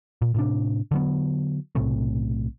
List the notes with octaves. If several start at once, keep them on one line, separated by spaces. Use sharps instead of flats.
A#2
A2 C3 D4
D3 F#3 B3
B1 A2 C3 A3